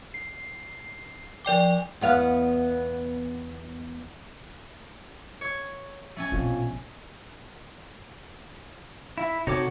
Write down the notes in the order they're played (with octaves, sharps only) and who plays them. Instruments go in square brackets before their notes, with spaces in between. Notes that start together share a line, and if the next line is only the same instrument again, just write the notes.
[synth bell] C7
F3 D5 G5 D6
[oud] E2 B3 F5
[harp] C#5
A3 C#4 G#5
[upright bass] A#1 B2 [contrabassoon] F2
[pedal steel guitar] E4 E5
[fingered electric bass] C3 [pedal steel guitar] D#4 C#5 D6 [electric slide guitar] F#4 A4